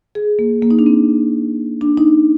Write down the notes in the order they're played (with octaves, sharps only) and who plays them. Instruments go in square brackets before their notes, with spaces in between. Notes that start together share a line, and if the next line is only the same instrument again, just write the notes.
[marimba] G#4
A#3
A#3
D#4
D4
C4
D4
D#4